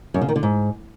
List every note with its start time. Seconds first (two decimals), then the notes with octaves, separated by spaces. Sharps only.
0.14 F#2
0.21 C#3
0.29 D#3
0.36 D3
0.43 G#2